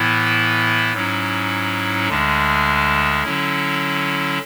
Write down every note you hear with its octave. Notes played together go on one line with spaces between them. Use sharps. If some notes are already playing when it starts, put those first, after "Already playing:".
Already playing: A2 E3 B3 E4
G#2 F#3 C#4 E4
D2 D3 G#3 D4
D3 F#3 C#4 E4